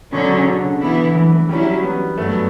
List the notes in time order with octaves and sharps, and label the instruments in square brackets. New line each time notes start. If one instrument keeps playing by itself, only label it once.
[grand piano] B2 [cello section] D3 F#3 C#4
[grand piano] C#3
D3
[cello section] E3 B3 E4
[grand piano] E3
E3
[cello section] F#3 C#4 E4 [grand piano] G3
[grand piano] B3
[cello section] G2 F#3 B3 [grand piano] A3